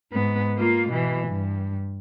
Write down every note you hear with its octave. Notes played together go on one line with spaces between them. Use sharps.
G#2 B3
A#3 F4
B2 E3
G2